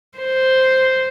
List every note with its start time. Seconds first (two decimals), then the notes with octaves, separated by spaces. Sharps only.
0.19 C5